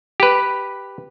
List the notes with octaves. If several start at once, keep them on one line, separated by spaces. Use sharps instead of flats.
G4 B4